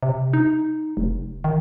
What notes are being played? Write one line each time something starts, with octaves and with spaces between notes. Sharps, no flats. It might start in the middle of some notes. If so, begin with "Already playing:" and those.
C3
D#4
F1
D#3